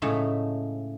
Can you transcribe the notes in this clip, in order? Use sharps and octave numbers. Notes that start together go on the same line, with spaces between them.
A2 C#3 G#3 A3 D#4